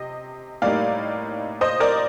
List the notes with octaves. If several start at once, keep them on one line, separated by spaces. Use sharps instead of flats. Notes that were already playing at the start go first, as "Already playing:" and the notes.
Already playing: C3 D#5
A2 G3 A#3 D#4 D5 F5
C5 D#5
A#4 D5